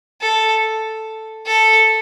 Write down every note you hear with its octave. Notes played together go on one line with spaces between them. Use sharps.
A4
A4